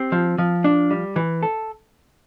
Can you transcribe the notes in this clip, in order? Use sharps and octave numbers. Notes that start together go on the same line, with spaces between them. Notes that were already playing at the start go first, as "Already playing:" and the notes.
Already playing: C4 G4
F3
F3
D4
G3
E3
A4